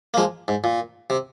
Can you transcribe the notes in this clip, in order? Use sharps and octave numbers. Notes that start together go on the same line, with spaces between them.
A#3
F3 G#3
G#2
A#2
C3